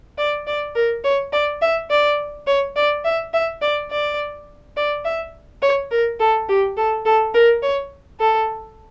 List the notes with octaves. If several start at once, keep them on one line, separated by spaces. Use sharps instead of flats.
D5
D5
A#4
C#5
D5
E5
D5
C#5
D5
E5
E5
D5
D5
D5
E5
C#5
A#4
A4
G4
A4
A4
A#4
C#5
A4